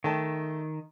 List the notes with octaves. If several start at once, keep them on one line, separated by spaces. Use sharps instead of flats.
D#3 A3 G5 A5